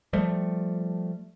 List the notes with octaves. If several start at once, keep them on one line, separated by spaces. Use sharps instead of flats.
F3 G3 A3